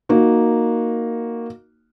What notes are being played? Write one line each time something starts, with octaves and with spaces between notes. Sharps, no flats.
A#3 D#4 F#4